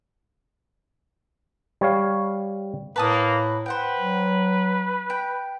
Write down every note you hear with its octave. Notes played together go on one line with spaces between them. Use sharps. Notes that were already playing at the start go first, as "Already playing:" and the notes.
G3 C#5 F5
A2 A#3 B4 A5 D#6
B4 C5 F#5 G5
F#3
G5